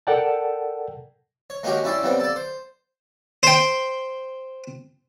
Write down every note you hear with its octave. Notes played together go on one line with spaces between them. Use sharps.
A4 A#4 D5 F#5 G5 A5
C#5
G#3 A#3 C#4 D#4 F#4 G4
C#4 E4 D5 G5 C6
C#3 G3 B3 C4
A4 D5
C5
C5 G5